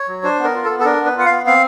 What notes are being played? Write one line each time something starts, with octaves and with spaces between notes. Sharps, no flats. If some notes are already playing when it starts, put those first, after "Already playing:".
Already playing: C#5
F#3
D4 C5
B3
A#4
F4
B3 A4
A4
D4 A#4
B3 B4
F4 F#5
F5
B3
C4 F5